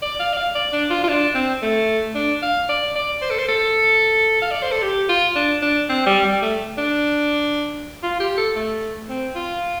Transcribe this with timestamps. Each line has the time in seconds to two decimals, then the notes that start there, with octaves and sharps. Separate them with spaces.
0.02 D5
0.20 F5
0.33 D5
0.37 F5
0.55 D5
0.73 D4
0.90 F4
1.04 F4
1.08 D4
1.35 C4
1.62 A3
2.15 D4
2.43 F5
2.69 D5
2.95 D5
3.22 C5
3.31 A4
3.39 C5
3.49 A4
4.42 F5
4.51 D5
4.63 C5
4.72 A4
4.82 G4
5.09 F4
5.36 D4
5.62 D4
5.89 C4
6.06 G3
6.25 G3
6.42 A3
6.78 D4
8.03 F4
8.20 G4
8.37 A4
8.56 A3
9.09 C4
9.36 F4